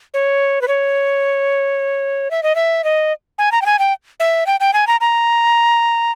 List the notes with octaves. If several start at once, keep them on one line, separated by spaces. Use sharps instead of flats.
C#5
B4
C#5
E5
D#5
E5
D#5
G#5
A#5
G5
G#5
G5
E5
G5
G5
G#5
A#5
A#5